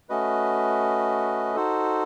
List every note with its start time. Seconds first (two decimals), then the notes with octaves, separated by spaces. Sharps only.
0.09 A3 C#4 F#4 B4 D#5
1.56 D#4 F#4 A4 C5